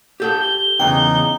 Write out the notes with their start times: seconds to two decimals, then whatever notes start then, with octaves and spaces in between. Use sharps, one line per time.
0.20 G4 A4 G5 G6
0.40 G7
0.80 E2 C#3 E3 D#4 G5